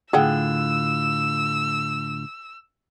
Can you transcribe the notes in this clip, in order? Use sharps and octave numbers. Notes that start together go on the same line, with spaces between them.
A2 D3 F4 G#4 F#5 G5 E6